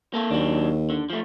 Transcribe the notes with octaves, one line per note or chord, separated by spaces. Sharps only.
A#3 A4
D#2 F#3 D4
D3
F3 A3